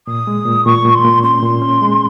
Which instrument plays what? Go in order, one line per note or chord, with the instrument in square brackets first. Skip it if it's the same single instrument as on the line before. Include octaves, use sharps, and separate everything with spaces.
[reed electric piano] A#2 [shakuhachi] D#6
[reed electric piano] G#3
A#2
[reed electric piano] A#2 [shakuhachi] C#6
[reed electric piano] A#2
[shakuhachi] C6
[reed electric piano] A#2
[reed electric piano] C#4 [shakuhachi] C6
[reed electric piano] A#2
C#4
G#3